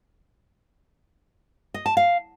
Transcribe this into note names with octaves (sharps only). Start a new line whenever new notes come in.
D#5
A5
F5